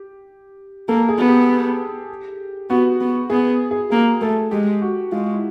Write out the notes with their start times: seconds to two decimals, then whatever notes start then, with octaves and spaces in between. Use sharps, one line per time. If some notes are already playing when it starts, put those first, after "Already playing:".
Already playing: G4
0.88 A#3 A4
1.09 G#4
1.18 B3
1.28 G4
2.70 B3 F#4
3.00 B3
3.30 B3 G#4
3.71 G#4
3.90 A#3 G#4
4.22 A3 A4
4.51 G#3 G4
4.82 F#4
5.12 G#3 F4
5.34 E4